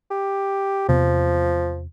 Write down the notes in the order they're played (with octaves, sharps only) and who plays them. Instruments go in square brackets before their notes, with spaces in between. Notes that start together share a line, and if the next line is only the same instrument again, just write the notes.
[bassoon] G4
[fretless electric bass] E2 C3 B3 [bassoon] F3